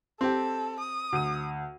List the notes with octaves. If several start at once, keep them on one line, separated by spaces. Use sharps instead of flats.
C4 G4 A4
D#6
D2 D#7